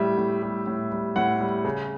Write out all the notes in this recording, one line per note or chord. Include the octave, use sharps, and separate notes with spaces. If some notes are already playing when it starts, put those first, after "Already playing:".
Already playing: A2 G3 E5
A2
G3
A2
G3
A2 F#5
G3
C#3